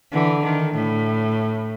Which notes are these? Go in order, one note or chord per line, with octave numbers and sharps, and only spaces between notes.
D3 E3
D#3
A2